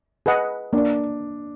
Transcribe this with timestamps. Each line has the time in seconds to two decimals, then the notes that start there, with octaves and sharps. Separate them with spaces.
0.26 G#4 B4 D#5 F#5
0.73 A#3 D4